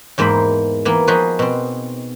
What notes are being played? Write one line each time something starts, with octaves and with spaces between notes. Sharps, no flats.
E2 G#2 A#3 E4 C5 B5
E3 A#3 B3
F3 D#4 F#4 G#4 B4
B2 C4